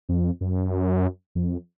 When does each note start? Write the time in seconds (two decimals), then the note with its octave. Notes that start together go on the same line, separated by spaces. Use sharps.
0.09 F2
0.41 F#2
1.35 F2